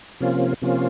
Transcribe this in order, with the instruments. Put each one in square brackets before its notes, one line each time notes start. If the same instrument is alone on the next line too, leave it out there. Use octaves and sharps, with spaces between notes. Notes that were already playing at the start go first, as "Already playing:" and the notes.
[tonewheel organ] C3 F3 A#3 C#4 F4
C3 F3 A#3 C#4 F4